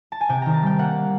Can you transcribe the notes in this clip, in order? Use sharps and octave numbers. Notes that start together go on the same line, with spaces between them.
A5
G#5
C3 G5
D#3 A#5
A5
G3 G5
A#3 F#5